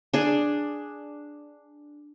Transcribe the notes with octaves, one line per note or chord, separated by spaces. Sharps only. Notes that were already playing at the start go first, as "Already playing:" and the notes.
D4 G#4